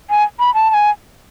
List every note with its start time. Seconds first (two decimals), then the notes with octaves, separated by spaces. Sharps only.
0.10 G#5
0.39 B5
0.54 A5
0.70 A5
0.74 G#5